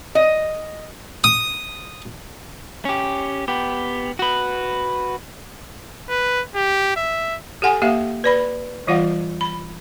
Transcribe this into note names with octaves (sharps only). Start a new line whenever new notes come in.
D#5
D#6
C#4 G4
B3 G4
F#4 B4
B4
G4
E5
G4 A4 F#5 G#5
A#3 G4 E5 F5
B4 D5 B5
E3 G3 F4 D5 F5 F#5
B5